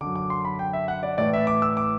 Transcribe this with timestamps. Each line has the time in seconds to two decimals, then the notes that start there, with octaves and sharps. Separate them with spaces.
0.01 F#2 D3 D6
0.16 D6
0.30 C6
0.45 B5
0.59 G5
0.73 E5
0.88 F#5
1.03 D5
1.18 A2 E3 D5
1.33 E5
1.47 D6
1.62 E6
1.77 D6